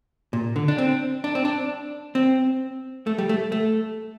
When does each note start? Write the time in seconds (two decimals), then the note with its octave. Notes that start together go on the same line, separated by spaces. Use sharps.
0.33 A#2
0.56 D3
0.68 D4
0.78 C4
1.24 D4
1.35 C4
1.45 D4
2.15 C4
3.07 A3
3.18 G3
3.29 A3
3.52 A3